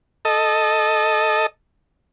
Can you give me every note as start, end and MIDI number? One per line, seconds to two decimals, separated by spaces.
0.25 1.46 69
0.25 1.46 75